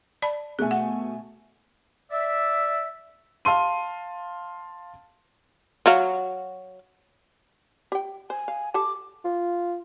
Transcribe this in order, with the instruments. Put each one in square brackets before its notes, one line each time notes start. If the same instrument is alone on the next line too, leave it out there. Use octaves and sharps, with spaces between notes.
[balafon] D5 A5 B5
[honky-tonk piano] B2 A3 G#5 [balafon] G#4
[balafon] F#5
[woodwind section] D5 E5
[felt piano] F5 A5 C6 D#7
[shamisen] F#3 F#4 F5
G4 G5
[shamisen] C5 [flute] G#5
[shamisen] F5
[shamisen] G4 A4 A5 [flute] D6
[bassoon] F4